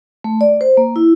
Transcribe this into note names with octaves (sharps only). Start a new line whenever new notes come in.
A3
D5
C5
A#3
E4